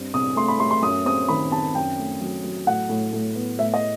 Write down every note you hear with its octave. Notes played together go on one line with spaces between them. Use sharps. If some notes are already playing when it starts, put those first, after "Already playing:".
Already playing: G2 C4
C2 D#6
A3 C6
B5
A3 C6
C6
F#2 D#6
C4 D#6
D#3 B5
C4 A5
F#2 G5
A3
F#3
F#3
A2 F#5
A2
A2
B3
A2 E5
D#5